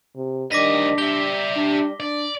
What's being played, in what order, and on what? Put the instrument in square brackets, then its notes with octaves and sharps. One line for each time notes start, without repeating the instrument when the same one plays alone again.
[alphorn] C3
[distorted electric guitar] D2 D#5 [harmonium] D#3 G3 [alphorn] D4 [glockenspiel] D6 A#6 B6
[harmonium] G3 [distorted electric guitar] G4 E5 [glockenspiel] G7
[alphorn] D4
[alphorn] D4 [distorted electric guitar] D5